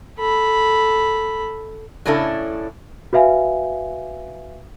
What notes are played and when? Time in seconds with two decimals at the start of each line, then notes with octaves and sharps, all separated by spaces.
0.18 A4 B5
2.05 A2 C#3 C#4 D4 E4 A4
3.13 F#4 B4 E5 F5 G#5